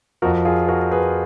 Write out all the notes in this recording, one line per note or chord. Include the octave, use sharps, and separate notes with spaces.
F2 F3 F#4 A#4
F4 G#4
F#4 A#4
G#4 B4